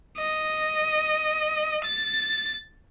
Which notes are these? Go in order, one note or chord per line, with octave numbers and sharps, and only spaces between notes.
D#5
A6